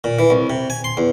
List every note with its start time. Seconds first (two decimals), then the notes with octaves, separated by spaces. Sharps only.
0.04 A#2
0.19 E3
0.30 C2
0.50 C3
0.70 G#5
0.84 C6
0.97 E2